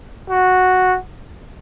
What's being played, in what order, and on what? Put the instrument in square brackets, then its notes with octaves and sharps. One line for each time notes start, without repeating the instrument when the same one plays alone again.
[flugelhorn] F#4